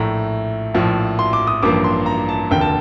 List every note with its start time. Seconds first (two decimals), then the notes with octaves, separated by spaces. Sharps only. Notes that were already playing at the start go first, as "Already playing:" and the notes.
Already playing: A#1 A2 A3 A#5
0.74 A#1 A2 F3
1.19 C6
1.33 D6
1.47 D#6
1.63 A1 G2 F3 A#3 D6
1.84 C6
2.06 A#5
2.29 A5
2.51 F1 D#2 D3 G5
2.61 A5